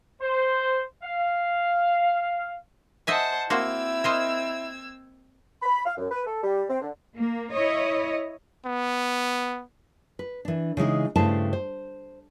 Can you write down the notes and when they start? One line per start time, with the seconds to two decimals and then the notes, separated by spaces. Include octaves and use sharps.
0.21 C5
1.03 F5
3.07 C5 D#5 E5 F#5 G#5 A5
3.50 A#3 C4 E4 F#4 C5 E6 G#6
4.04 A#4 C5 D#5
5.62 B5
5.85 F5
5.97 F#2
6.11 B4
6.26 A4
6.43 G3
6.69 C4
6.81 D3
7.17 A#3
7.52 E4 C#5 D#5
8.65 B3
10.19 B4
10.45 E3 D4
10.77 C#3 E3 G#3 D#4
11.16 G2 C#3 A3 E4 C5 A5
11.53 C5